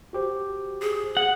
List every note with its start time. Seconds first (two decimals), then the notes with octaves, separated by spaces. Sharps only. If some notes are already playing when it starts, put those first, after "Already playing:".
0.13 F#4 G4 C5
0.82 G#4
1.17 F#5